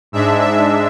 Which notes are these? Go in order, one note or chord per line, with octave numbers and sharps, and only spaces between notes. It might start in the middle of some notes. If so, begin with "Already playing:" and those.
G#2 G#3 D4 E5
E5